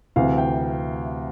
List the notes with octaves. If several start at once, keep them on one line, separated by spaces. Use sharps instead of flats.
D2 C3 E3 F5
G5